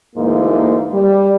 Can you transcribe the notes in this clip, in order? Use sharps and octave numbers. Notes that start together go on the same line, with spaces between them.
D2 G#2 E3 A#3
G3